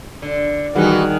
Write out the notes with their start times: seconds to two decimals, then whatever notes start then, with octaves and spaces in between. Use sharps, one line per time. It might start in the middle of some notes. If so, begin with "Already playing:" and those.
0.22 D3
0.76 D#3 E3 G3 D#4 F#4 G#4 F#5